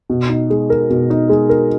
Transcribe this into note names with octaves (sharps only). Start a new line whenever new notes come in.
B2
D#4
G#3
A#4
B2
D#4
G#3
A#4